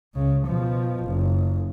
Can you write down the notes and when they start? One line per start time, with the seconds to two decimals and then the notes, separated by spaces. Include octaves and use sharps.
0.14 C#2 C#3
0.46 B2 F3
1.05 F#1